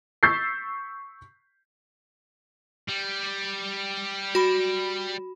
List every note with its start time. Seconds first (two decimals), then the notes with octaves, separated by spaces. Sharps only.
0.23 C#6 E6 G6 A6 B6 C7
2.88 G3
4.35 F#4 B5